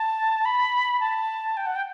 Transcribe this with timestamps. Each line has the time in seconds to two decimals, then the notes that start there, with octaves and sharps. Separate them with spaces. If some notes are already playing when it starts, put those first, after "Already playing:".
Already playing: A5
0.45 B5
1.00 A5
1.57 G5
1.66 F#5
1.75 G5